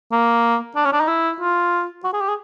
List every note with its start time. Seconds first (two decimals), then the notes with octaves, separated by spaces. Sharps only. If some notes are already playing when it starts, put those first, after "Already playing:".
0.12 A#3
0.76 D4
0.85 C#4
0.93 D4
1.01 D#4
1.08 E4
1.40 F4
2.04 F#4
2.13 G#4
2.21 G4
2.28 G#4